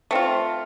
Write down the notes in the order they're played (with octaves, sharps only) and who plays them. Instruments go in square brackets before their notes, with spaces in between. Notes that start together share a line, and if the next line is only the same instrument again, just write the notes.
[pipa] A3 C4 F4